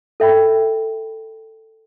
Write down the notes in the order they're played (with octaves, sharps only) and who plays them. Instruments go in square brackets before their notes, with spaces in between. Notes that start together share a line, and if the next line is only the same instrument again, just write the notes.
[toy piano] A4 E5 G5 B5